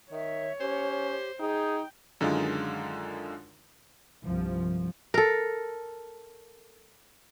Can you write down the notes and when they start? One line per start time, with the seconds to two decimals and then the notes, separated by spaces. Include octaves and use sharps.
0.12 D#3 C#5 E5
0.60 C#4 G4 C5
1.39 D#4 G#4 G5
2.21 F#2 D3 D#3 G#3 D#4 F4
4.24 C2 G2 F3
5.14 A4 A#4